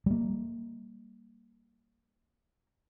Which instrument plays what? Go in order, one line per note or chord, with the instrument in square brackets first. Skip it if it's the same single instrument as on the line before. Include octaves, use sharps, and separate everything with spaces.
[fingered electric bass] G3 A#3